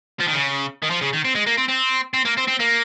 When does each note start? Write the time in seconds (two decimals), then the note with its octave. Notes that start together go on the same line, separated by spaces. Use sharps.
0.20 F3
0.27 D#3
0.33 C#3
0.83 D#3
0.90 F3
1.01 C#3
1.13 D#3
1.25 C4
1.35 G#3
1.47 A#3
1.58 C4
1.69 C4
2.14 C4
2.25 A#3
2.37 C4
2.47 C4
2.60 A#3